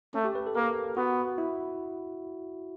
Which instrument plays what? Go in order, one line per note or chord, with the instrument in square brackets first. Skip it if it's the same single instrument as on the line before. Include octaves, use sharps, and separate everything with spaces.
[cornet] A3 [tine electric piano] C#4
[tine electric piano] G4
B4
A4
[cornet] A#3 [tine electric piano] A#4
[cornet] B3 [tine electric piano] F#4
[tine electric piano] E4